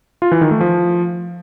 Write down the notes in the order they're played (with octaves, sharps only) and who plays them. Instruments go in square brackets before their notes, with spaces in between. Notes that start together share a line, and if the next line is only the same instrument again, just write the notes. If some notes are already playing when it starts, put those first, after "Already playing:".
[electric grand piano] F4
E3
D#3
A3
F3